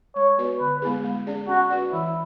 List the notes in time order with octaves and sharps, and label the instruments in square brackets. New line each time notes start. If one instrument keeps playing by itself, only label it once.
[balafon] G#3 [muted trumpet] C#5
[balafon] B3 F#4 B4 D5
[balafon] D3 [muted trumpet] B4
[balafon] G#3 B3 E4 G#4
G#3
C#4 G#4 D5
[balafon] C#4 [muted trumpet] F#4
[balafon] F#4 B4 D5
[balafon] E3 [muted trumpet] E4